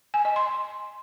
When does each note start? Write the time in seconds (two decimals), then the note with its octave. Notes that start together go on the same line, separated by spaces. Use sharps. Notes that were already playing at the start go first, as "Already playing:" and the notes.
0.14 G#5
0.25 D#5
0.36 C6